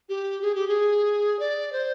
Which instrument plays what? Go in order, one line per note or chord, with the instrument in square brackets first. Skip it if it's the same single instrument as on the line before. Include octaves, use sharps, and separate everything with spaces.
[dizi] G4
G#4
G4
G#4
D5
C5